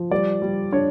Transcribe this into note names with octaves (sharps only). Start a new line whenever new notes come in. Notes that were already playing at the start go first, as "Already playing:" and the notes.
Already playing: F3
G3 D5
G3
D4 C#5